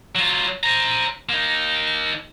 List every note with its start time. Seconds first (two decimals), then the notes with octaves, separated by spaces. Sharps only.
0.15 F#3 F4
0.63 C5 A#5
1.29 A#3 D#4